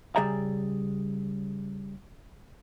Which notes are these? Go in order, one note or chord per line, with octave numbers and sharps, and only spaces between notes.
C#3 G3 G#4 D5 E5 A#5